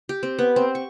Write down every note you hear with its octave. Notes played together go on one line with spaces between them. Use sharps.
G4
C4
B3
C4
C#6